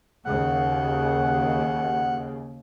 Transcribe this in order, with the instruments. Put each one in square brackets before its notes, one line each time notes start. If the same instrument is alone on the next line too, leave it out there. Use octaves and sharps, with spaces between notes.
[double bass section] D#2 C#3 [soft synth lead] F#5